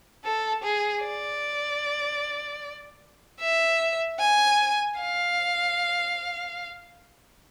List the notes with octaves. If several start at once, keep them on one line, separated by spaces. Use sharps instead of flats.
A4
G#4
D5
E5
G#5
F5